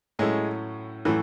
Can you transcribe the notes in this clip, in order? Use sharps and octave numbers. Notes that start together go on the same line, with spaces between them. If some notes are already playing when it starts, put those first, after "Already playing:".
A2 F#3 G#3 C#4 E4 A4
A2 E3 F#3 C#4 E4 A4